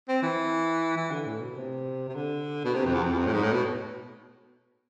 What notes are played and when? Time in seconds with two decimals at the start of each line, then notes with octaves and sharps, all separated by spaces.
0.08 C4
0.23 E3
0.97 E3
1.11 D3
1.26 A2
1.41 B2
1.56 C3
2.08 C3
2.15 D3
2.65 B2
2.74 C3
2.85 F2
2.94 E2
3.04 F2
3.12 E2
3.18 F2
3.27 A2
3.33 G#2
3.43 A2
3.53 B2